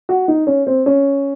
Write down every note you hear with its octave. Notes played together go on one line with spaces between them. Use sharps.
F#4
D#4
C#4
C4
C#4